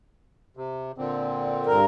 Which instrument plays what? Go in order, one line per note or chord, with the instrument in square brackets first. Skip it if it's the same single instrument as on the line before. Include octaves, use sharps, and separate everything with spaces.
[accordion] C3
A#2 D3 C4
[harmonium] G2 A#4